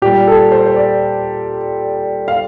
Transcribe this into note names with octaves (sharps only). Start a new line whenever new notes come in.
A#2 G3 G4
A4
C5
C5
D5
F5